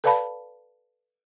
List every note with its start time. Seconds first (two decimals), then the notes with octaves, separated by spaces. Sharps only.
0.04 A4 B4 D5 F5 A5 B5